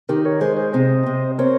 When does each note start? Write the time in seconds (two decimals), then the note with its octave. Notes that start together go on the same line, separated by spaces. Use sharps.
0.09 D#3 G4 A#4
0.25 A#4 C#5
0.41 G#3 G#4 C5
0.57 G#4 C5
0.73 C3 C5 D#5
1.06 C3
1.38 C4 A#4 C#5